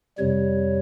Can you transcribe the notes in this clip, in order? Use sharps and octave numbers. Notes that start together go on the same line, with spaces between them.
F2 C3 G3 C#5